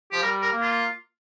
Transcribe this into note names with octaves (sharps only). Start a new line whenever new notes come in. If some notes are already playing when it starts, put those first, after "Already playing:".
F3 G4
G3 A#4
A#4
A#3
F4